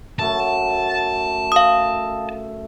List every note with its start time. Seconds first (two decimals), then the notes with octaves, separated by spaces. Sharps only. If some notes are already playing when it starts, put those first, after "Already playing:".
0.19 F#2 A3 F#5 A5
1.52 A4 F5 D#6